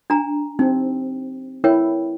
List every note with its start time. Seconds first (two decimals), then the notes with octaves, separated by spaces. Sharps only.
0.10 D4 G#5 A#5
0.59 C4 D#4
1.64 E4 A#4 C#5 G5